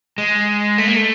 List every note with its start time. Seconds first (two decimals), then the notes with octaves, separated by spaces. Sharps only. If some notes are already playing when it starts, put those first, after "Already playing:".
0.18 G#3
0.78 A3
0.88 A#3
0.96 A3